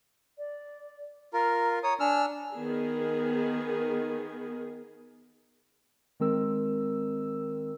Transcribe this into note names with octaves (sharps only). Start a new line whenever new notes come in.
D5
F4 A#4 A#5
C#5 A#5 D#6
D4 G#5 E6 F6
D#3 B3 G#4
D#3 G#3 C4 A#4 E6